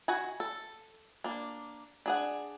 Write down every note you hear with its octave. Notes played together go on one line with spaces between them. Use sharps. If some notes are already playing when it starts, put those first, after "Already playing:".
D#3 F#4 F#5 G#5
A4
A#3 D4
D4 G#4 F#5